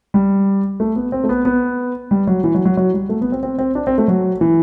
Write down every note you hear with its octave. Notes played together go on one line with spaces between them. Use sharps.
G3
A3
B3
C4
A3
B3
B3
G3
F#3
E3
F#3
F#3
F#3
G3
A3
B3
C4
C4
C4
D4
C4
A3
F#3
E3